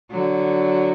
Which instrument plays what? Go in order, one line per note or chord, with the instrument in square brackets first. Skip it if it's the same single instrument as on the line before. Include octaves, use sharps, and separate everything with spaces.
[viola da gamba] D3 F#3